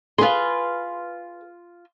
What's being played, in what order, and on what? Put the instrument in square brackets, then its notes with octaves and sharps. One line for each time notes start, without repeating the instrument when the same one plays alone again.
[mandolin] F4 C6 [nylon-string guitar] G#4 B4